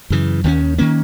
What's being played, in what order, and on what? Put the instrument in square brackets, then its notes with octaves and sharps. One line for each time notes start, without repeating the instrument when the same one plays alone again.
[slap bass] F#2 C#3 E3
D#2 D#3 F#3 C#4
D#3 A#3 C#4